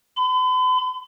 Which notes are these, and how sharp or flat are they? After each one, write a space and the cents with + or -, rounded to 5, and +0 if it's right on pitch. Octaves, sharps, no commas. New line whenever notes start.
B5 +45